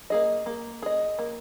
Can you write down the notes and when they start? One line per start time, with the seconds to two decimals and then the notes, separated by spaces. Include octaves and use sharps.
0.10 A#3 G#4 D#5
0.46 A#3
0.82 G#4 D#5
1.19 A#3